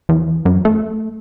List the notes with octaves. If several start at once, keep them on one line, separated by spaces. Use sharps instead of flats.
E2
F#2
A3